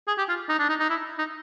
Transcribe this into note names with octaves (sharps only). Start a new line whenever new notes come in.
G#4
G4
F4
D#4
D4
D#4
D#4
E4
D#4